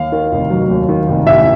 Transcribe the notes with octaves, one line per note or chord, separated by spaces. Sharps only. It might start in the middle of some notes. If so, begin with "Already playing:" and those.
Already playing: D#2 F5
D#3
F1
F#3
D#2
D#3
F1
A1 E5